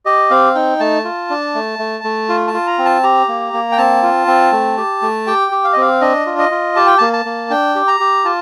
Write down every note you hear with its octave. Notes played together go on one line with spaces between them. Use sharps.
G4 D#5
C4 F5
D#4 G5
A3 A5
F4
D4
A3
A3
A3
F4
A5
F4
A#5
C4
A5
G4 A#5
A#3
A#3
G5
C4 A5
F4
C4
A3
G4
A3
G4 G5
G4
F5
D#5
C4 F5
D4 D#5
F4
D#5
F4
G4 A5
G5
A#3 A5
A5
A#3
D4 G5
G4
A#5
G4
F4 A5